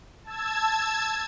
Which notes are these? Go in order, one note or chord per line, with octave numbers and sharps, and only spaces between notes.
A5 E6 G#6